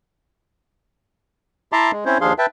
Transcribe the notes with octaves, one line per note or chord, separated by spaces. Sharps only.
E4 E5 A5 A#5 C6 D6
G#3
C4 C#4 E4 C5 C#5
D#2 F3 D4 G#4 F5 C6
B4 E5 G5 A5